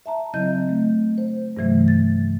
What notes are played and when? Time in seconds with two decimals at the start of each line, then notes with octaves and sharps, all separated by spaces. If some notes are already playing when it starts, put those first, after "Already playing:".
0.06 E5 A5 A#5
0.34 C#3 F#3 C4 E4 D#5 G6
0.69 A3
1.18 C5
1.57 G2 C3 D#3 E3 F#3 A3
1.88 A6